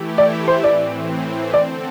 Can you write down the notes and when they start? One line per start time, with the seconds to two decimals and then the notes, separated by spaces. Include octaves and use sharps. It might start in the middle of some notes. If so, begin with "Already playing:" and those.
Already playing: E3 A3 E4 G4
0.18 D5
0.48 C5
0.63 A2 E3 C4 D5
1.54 D3 C4 A4 D5